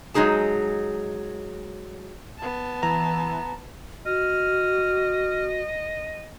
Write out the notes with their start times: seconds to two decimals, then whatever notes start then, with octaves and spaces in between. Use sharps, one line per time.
0.14 F#3 G#3 D#4 G#4 A5
2.38 B3 A5
2.83 E3 A#5
4.06 F#4 D#5 F6